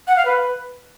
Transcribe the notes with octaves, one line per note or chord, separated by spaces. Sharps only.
F#5
F5
B4